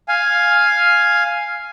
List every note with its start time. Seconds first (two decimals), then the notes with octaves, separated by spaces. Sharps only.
0.08 F5 G#5